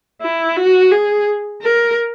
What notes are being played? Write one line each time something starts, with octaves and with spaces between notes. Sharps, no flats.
E4
F#4
G#4
A#4